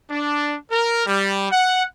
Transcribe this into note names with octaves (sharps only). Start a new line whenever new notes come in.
D4
A#4
G3
F#5